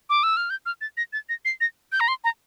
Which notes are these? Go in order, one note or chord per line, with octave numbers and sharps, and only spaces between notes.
D6
E6
F6
G6
F6
A6
A#6
A6
A#6
C7
A#6
G6
A#5
C6
A#5